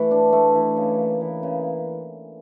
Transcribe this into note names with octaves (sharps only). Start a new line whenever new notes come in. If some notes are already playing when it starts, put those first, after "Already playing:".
Already playing: E3 A3
D4
A3
E3
C#3
A#3
E3
C#3